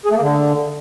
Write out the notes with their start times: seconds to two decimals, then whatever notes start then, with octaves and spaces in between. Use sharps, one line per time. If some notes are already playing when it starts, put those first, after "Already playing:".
0.06 G#4
0.11 A3
0.16 A#3
0.21 D3